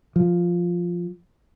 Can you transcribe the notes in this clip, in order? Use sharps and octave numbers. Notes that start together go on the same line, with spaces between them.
F3